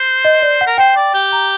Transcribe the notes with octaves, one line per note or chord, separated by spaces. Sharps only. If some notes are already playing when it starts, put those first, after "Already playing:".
Already playing: C5
D#5
D5
F#5
A#4
C5 G5
D5
G4
A#5